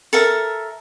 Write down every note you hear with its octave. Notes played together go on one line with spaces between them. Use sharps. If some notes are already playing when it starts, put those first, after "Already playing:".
A4 A#4 E5